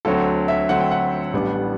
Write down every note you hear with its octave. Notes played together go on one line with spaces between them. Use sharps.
D2 D3 F#3 C4 A4
E5
D2 D3 F#3 C4 F#5
G5
F#5
A1 A2 G3 B3 D4